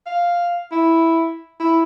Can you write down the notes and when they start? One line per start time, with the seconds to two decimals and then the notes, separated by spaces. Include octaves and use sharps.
0.06 F5
0.72 E4
1.60 E4